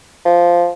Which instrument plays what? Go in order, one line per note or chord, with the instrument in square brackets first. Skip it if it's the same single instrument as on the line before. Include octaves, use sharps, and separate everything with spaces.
[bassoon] F3